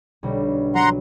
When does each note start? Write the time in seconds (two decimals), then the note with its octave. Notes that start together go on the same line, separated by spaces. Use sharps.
0.23 B1 D3 G3
0.75 F#3 F#5 A#5 C6